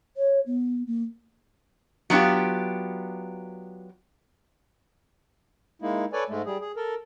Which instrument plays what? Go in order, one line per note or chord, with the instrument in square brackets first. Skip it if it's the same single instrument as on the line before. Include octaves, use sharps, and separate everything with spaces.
[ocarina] C#5
B3
A#3
[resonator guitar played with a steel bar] F#3 B3 D4 F4 G4
[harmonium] G#3 A#3 D#4 E4
A4 B4 C#5 D5 G#5
G#2 G#3 A3
G3 G#4
G#4
A4 A#4